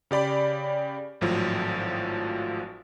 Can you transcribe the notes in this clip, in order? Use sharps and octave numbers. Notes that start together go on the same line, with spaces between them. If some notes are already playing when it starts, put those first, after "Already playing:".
C#3 G4 D5 B5
G#1 A2 F3 F#3